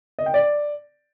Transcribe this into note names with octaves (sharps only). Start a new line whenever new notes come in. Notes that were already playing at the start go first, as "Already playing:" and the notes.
D#5
G5
D5